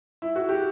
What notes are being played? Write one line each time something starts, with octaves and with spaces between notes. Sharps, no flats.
E4
F#4
G4